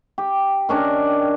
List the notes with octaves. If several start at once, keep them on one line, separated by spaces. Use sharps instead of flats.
G4
D#3 C#4 D4 A#4